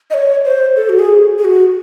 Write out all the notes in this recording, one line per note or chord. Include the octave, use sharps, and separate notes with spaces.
D#5
C#5
C5
A4
F#4
G#4
G#4
F#4